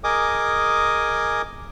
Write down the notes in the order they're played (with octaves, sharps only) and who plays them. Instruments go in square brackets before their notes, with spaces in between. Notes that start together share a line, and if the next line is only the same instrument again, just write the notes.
[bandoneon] G#4 A#4 D#5 G#5 D6 D#6